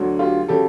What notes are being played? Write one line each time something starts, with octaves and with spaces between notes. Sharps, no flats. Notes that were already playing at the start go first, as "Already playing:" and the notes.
Already playing: D2 D3 F#3
F4 G4
C#3 F#3 G4 A4